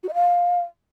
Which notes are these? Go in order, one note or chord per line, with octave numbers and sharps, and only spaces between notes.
F#4
D#5
F5